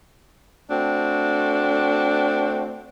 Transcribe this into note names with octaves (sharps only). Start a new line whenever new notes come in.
A3 C4 D4 F#4